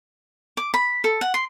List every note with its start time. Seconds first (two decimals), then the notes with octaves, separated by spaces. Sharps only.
0.57 D6
0.74 B5
1.04 A4
1.21 F#5
1.34 C6